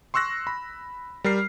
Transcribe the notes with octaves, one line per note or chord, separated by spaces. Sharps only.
C6 C#6 E6 F#6 A#6
B5
G3 A#4 F6 C7